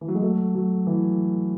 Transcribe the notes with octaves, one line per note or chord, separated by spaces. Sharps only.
E3
F#3
G#3
F#3 A3
F#3
E3